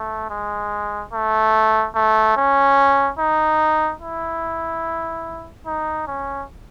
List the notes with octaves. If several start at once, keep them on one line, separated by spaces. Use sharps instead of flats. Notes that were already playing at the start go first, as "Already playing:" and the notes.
Already playing: A3
G#3
A3
A3
C#4
D#4
E4
D#4
C#4